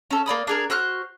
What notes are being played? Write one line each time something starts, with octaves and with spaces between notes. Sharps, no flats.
C#4 A4
A#3 D5 B5 D#6
D4 G#4 A#4
F#4 C5 F6 F#6